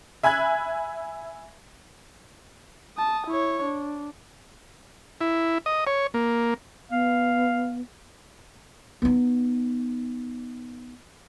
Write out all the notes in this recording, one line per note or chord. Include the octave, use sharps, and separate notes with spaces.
E5 G#5 B5 F#6 G#6
A5 D#6
E4 C#5
D4
E4
D#5
C#5
A#3
B3 F5
B3 D#4